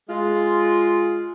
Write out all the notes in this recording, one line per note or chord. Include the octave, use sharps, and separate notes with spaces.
G#3 F4